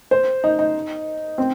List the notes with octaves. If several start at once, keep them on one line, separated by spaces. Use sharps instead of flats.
C5
D#4
D#4
C4